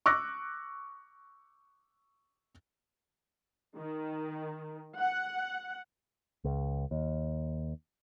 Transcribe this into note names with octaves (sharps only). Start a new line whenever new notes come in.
C#6 D6 E6 F#6 A#6
D#3
F#5
C#2
D#2